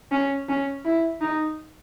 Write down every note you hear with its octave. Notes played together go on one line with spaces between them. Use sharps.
C#4
C#4
E4
D#4